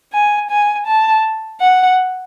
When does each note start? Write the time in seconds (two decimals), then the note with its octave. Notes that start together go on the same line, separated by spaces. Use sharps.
0.13 G#5
0.51 G#5
0.87 A5
1.61 F#5